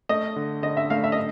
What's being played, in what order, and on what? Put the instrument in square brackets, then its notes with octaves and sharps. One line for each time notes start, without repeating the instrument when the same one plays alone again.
[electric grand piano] A3 [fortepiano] D#5
[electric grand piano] D3
[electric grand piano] D3 [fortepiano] D#5
[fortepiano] E5
[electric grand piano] A3 [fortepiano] F5
[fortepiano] E5
D#5